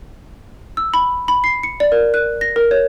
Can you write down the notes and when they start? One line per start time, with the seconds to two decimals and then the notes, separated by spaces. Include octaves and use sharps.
0.77 E6
0.94 B5
1.28 B5
1.44 C7
1.63 C#7
1.80 D5
1.92 A#4
2.14 F#6
2.41 A#6
2.56 A#4
2.71 C#5